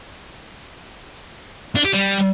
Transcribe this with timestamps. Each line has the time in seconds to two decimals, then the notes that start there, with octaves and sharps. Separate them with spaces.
1.76 D4
1.85 G4
1.94 G3